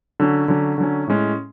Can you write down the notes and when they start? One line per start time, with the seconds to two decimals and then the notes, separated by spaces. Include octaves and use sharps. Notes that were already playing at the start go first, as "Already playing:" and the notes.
0.20 D3 F#3 C#4
0.48 D3 F#3 C#4
0.78 D3 F#3 C#4
1.07 A2 G#3 C#4